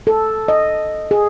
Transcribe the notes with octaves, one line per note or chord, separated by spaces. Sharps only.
A4
D#5
G#4